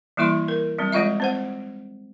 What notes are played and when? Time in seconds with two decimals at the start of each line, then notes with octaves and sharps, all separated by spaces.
0.17 E3 G3 A#3 E4 E5 C6
0.48 A#4
0.78 F#3 G3 C4
0.92 F3 G#3 F4 D#5 E5
1.20 C4 C5 F#5